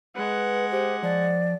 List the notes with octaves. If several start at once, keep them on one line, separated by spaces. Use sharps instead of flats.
G#3 B4 F#5
G4 C5
F3 D5